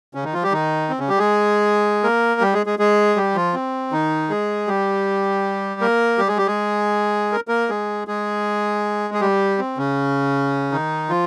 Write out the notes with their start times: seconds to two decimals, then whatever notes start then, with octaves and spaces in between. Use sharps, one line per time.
0.14 C#3 C#4
0.24 D#3 D#4
0.33 F3 F4
0.43 G3 G4
0.52 D#3 D#4
0.90 C4
1.00 C#3 C#4
1.09 G3 G4
1.18 G#3 G#4
2.03 A#3 A#4
2.41 G3 G4
2.54 G#3 G#4
2.66 G#3 G#4
2.79 G#3 G#4
3.16 G3 G4
3.35 F3 F4
3.54 C4
3.92 D#3 D#4
4.30 G#3 G#4
4.68 G3 G4
5.81 A#3 A#4
6.18 G3 G4
6.28 G#3 G#4
6.37 G3 G4
6.47 G#3 G#4
7.32 A#4
7.48 A#3 A#4
7.70 G#3 G#4
8.08 G#3 G#4
9.14 G#4
9.21 G3 G4
9.58 C4
9.78 C#3 C#4
10.72 D#3 D#4
11.09 F3 F4